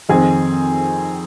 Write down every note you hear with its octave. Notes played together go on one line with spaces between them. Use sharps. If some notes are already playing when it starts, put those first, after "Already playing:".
F2 D#3 C4 G#4